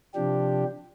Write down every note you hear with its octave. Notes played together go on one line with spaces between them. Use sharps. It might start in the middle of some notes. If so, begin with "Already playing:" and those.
C3 F3 D4 G4